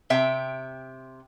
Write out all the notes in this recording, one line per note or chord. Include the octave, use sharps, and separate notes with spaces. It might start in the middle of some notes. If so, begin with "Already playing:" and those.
C3 E5 G5